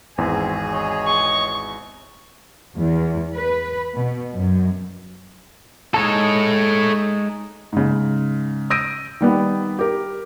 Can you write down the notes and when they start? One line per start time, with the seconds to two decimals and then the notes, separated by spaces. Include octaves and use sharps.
0.18 G#1 E2 C4 G#4
0.72 C#5 D#5
1.06 C#6
2.76 E2
3.35 B4
3.94 B2
4.35 F#2
5.94 G#3 D#4 A4 C#5 A5
7.73 G#2 C#3
8.70 D#6 E6 G6 A#6 D7 D#7
9.21 D#3 G3 B3
9.79 G4 A#4